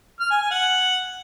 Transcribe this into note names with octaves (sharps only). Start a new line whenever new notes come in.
F6
G#5
G#5
F#5